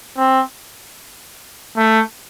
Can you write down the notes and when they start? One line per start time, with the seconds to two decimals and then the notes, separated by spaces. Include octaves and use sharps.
0.18 C4
1.77 A3